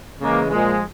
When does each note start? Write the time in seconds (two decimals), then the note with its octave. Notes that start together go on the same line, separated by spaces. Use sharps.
0.21 C#3 E3 G#3 A#3
0.51 A#2 F3 G#3